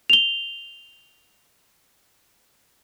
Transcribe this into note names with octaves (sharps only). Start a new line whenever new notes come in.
F7 G7